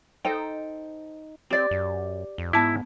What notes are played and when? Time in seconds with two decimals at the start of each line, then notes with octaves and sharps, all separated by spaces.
0.25 D#4 A4 C5 G5
1.50 C4 G4 D5
1.71 F#2
2.38 F2
2.53 G#2 B3 E4 A5 D6